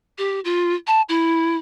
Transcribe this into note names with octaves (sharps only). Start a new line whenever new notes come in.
G4
F4
A5
E4